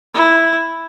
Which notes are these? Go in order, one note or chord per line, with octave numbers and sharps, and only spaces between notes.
E4